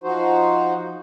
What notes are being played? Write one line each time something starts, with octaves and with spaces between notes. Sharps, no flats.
F3 D#4 F#4 C5